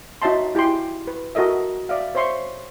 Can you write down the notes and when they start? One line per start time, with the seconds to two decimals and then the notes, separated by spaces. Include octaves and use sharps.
0.22 D#4 F#4 C#5 E5 A5 C6
0.55 E4 G4 G5 G#5 C6
1.07 B4
1.35 F#4 A4 A#4 D#5 E5
1.89 D5 E5 F5
2.15 C5 C#5 E5 C6 C#6